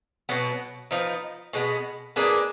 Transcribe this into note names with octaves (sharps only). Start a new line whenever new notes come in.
B2 F#3 B3
F3 B3 D#4
B2 G#3 B3
A#3 D4 G#4 B4